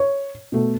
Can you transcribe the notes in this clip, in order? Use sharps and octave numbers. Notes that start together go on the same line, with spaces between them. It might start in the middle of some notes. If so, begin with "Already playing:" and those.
Already playing: C#5
B2 A3